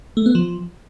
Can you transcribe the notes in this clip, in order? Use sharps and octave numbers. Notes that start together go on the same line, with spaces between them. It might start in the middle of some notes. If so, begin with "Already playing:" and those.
A3
B3
F3